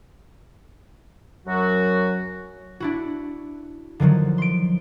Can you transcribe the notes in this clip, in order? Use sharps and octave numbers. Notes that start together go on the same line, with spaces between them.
F#2 F#3 F#4
D4 E4 F#4
D3 D#3 F3 F#3
C6 D7